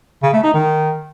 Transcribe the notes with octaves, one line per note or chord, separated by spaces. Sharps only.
C#3
A3
D#4
D#3